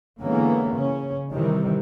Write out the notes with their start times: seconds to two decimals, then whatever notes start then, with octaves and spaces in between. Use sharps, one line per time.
0.22 D3 E3 G#3 A#3 B3 C#4
0.73 C#3 C#4
1.33 C3 D#3 E3 G3